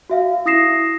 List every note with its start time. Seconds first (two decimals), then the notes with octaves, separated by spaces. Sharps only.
0.10 F#4 E5 F5
0.46 E4 D#6 A#6 C7 E7